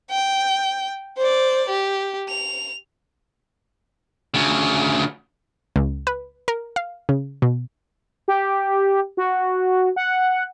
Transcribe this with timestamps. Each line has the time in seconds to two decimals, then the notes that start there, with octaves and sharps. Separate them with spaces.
0.10 G5
1.17 C5 D5
1.69 G4
2.29 F7
4.34 D2 C#3
5.76 C#2
6.07 B4
6.48 A#4
6.76 F5
7.09 C#3
7.42 B2
8.28 G4
9.17 F#4
9.96 F#5